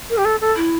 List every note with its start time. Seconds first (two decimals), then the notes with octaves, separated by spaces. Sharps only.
0.10 A#4
0.17 G4
0.25 A4
0.41 A4
0.56 E4